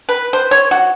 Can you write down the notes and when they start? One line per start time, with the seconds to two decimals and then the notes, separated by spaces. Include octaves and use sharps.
0.09 B4
0.33 C5
0.51 C#5
0.71 F#4